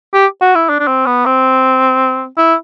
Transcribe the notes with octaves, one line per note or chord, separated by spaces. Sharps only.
G4
F#4
E4
D4
D4
C4
B3
C4
E4